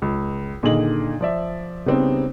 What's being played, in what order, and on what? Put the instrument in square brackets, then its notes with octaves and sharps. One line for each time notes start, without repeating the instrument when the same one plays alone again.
[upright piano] C#2
A#2 D3 D#3 G#4 D#5 F#7
F3 D5 E5
C#3 G3 B3 C4 D#4